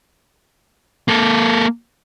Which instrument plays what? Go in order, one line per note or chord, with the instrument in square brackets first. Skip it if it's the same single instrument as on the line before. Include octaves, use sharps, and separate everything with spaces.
[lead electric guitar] A#3 A4